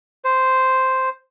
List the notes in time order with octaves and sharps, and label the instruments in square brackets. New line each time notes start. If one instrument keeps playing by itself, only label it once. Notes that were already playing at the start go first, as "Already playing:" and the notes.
[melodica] C5